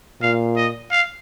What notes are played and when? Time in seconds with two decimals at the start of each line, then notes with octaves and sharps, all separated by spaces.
0.21 A#2 F5
0.56 D#5
0.91 F5